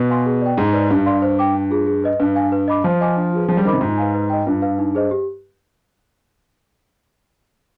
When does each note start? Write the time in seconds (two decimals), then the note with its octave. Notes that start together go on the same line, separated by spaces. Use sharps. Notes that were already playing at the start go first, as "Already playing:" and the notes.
Already playing: B2
0.09 B4 F5 G#5 C6
0.26 G#4
0.41 D5 G5
0.57 G#2 G#4
0.73 B4 D5
0.90 G2 G4
1.06 D5 F5 C6
1.22 C5
1.39 G5 D6
1.55 D4
1.71 F4 G#4
1.87 G#4
2.04 B4 D#5
2.20 G2 B4
2.35 F5 G#5
2.52 B4
2.68 D#5 B5 D6
2.84 F3 C5
3.01 D#5 G#5 D6
3.17 D4
3.33 F4 G#4 B4
3.48 F3 G#4
3.57 G3
3.65 D#3 C5 D#5 B5 D6
3.73 C3
3.81 G#2 F4
3.98 B4 F5 G#5
4.14 B4
4.30 D#5 G5
4.46 G2 F4
4.62 B4 F5
4.79 D#4
4.95 G#4 C5 D#5
5.11 G4